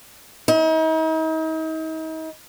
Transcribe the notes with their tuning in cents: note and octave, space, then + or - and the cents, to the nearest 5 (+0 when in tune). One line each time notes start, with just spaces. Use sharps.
D#4 +40